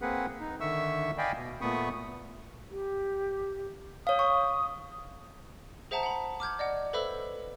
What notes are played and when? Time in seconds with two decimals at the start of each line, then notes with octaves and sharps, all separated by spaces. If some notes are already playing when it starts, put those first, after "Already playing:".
0.02 A#3 C4 G#4 B4 F#5
0.40 D#4
0.61 D3 D#3 E5 C#6 E6
1.18 D5 D#5 F5 G5 G#5 B5
1.36 B2
1.61 A#2 A3 B3 B5 C#6 D#6
2.71 G4
4.07 C#5 F5 D#6
4.19 C#6
5.91 G#4 C5 E5 F#5 A5 A#5
6.03 F#5 B5
6.40 D6 F6 G6 G#6
6.59 D5 D#5 F#5
6.93 A4 B4 C5 E5 B5 E6